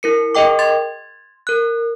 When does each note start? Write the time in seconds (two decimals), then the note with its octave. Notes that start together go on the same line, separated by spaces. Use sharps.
0.03 E4 A#4 C#7
0.35 G#4 A#4 D#5 G5 D6
0.59 C6 G#6 A6
1.47 A#4 F#6